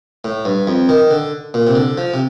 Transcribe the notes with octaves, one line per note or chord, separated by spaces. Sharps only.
A2
G2
F2
D#3
D3
A#2
C3
D3
F3
C3